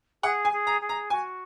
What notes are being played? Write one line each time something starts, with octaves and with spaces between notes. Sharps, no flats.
G#4 F#5
G#5
G#4
A#5
G#4
A#5
F#4 G#5